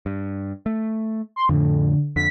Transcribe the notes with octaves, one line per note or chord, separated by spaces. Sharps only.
G2
A3
C6
F2 A2 D3
F2 D3 B6